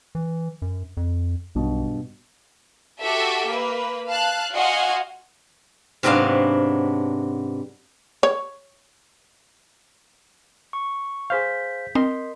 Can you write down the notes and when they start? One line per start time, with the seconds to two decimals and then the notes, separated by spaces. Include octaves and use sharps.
0.15 E3
0.62 F#2
0.97 F2
1.55 B1 G2 B2
3.01 F#4 G4 A4 E5
3.50 A#3 B4
4.08 F5 A5 F#6
4.54 F#4 D#5 F5 F#5 G#5 C6
6.03 G#2 C3 F#3 B3 D4 F5
8.23 C#5
10.73 C#6
11.30 G#4 C5 F5 G6 B6
11.95 C4 A#4 D#5 C6